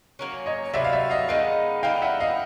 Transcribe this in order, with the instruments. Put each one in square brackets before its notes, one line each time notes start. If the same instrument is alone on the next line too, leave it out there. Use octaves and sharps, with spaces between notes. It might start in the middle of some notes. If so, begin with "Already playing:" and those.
[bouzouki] F#3 A#3 C#4
[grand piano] C#5 D#5
[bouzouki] C3 D#3 F#3 B3 [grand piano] D5 E5
[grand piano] F5
D5 E5
D#5 F5
[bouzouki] D#3 G#3 B3 D#4 [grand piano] D#5 F5
[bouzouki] E3 G3 B3 D#4 [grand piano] F5 G5
[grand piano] E5 F#5
D#5 F5